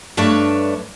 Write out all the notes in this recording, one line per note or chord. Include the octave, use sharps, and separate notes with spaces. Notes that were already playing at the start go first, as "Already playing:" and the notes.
G2 A3 D4 B4 C#5